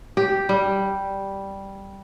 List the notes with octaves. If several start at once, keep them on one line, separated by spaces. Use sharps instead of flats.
G4
G3